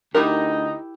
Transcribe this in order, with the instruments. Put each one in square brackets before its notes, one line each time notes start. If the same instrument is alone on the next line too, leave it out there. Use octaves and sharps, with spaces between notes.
[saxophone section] D2 D#4 [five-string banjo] E4 G4 A#4